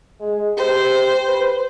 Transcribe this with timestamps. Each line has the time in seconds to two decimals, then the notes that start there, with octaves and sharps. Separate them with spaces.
0.20 G#3
0.57 G4 C5
1.28 B4